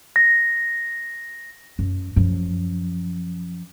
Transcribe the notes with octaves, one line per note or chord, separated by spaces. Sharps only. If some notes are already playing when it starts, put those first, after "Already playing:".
A#6
F#2
F#2 F3